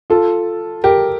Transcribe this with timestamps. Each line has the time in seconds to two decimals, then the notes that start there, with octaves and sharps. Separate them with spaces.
0.10 F4 A4
0.84 G4 A#4